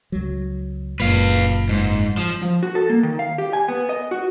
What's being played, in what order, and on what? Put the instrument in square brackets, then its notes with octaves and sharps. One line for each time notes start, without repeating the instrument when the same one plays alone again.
[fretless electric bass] C#2 F#3
[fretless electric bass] F#1 F#2 A#2 [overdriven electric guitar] B4 F5
[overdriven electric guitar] G#2
F3
[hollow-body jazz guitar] F3
F#4
A4
A#3
D#3
F5
G4
G#5
B3
D#5
F#4